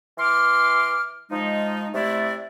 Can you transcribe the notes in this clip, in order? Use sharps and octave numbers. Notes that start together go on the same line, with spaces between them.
E3 C6 D6 F6
F3 G#3 D#4
C3 A3 E4 D5